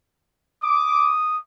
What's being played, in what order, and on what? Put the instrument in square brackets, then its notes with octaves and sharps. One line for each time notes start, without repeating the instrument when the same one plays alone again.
[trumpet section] D6 [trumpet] D#6